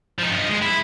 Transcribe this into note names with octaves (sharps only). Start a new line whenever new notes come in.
F3 D#4
G2 D#5
G#3
E4